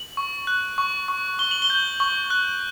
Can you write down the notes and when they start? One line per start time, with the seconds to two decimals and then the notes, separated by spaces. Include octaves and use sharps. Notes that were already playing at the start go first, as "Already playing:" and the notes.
Already playing: F#7
0.17 C#6
0.47 F#6
0.78 C#6
1.08 C#6
1.39 C#6 G7
1.51 F#7
1.62 G7
1.70 G6
2.00 C#6
2.30 F#6